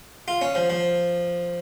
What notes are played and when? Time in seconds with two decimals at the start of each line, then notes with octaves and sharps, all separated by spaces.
0.28 F4
0.41 C#4
0.55 F3
0.70 F3